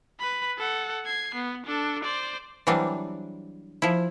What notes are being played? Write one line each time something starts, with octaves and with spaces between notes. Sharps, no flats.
B4 B5
A4 F#5
G#6 C7
B3
D4 A4
C5 D5
E3 F#3 G3 C4 D4
F3 E4